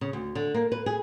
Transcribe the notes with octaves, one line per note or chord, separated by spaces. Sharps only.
C#3
D2
D3
A#3
B4
G#4